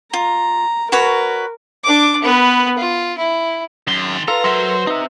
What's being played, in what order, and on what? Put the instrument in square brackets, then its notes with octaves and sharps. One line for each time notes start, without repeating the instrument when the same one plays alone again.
[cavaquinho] F4 [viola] A#5
[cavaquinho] F#4 B4 C#5 [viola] A#4
[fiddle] D4 D6
B3 B4
F4
E4
[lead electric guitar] F#2 [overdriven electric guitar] D#3 C6
[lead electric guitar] F4 [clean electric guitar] A4 [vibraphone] B4 C6 [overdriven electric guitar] A#5
[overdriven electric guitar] F#3 [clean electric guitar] A4 A#4 E5 [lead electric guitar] C5
[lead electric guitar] C4 E5 [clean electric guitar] D#4